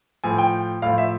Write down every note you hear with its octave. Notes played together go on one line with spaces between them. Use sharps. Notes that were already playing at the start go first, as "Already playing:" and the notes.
A2 F3 G#5
G5
A2 F3 F5
E5